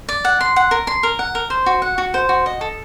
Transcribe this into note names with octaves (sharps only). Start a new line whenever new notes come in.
D5
F#5
C6
F#5
A#4
C6
A#4
F#5
A#4
C5
F#4
F#5
F#4
C5
F#4
D#5
A4